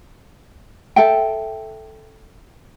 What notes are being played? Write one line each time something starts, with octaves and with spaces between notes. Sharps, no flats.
A4 E5 G5